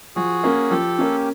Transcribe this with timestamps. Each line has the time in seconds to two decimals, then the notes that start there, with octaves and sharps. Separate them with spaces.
0.16 F3 F#4 G#4
0.44 A#3 C#4
0.71 F3 G4 A4
0.98 A#3 C#4